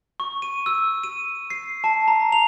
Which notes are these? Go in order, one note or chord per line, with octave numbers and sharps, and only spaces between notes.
C#6
D#7
E6
D#7
C7
A5
A#5
F7